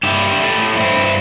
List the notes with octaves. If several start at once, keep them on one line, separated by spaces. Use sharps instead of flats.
G2 E4 G4
G3
A3
A2
G2 C4 E4
G2